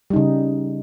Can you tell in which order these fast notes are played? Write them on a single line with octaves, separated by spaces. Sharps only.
G3 D#4 C#3